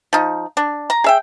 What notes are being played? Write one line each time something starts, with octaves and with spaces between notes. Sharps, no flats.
F3 D#4
D4
A#5
G#4 E5 G5